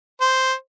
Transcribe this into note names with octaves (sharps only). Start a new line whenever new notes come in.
C5